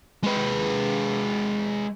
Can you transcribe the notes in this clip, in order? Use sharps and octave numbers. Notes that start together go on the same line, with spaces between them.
G#3 B4